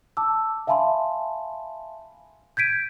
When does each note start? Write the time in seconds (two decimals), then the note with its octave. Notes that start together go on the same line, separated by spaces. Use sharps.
0.17 A5 D6 E6
0.67 E5 F5 G#5 A5 B5 C6
2.57 G6 G#6 B6 D7 D#7